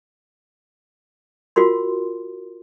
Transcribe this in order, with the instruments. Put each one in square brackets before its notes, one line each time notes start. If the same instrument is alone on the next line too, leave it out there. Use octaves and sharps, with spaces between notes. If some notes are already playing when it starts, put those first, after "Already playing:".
[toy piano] F4 F#4 A#4 C6